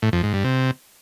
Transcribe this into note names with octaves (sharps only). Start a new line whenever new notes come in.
A2
F2
G#2
G2
C3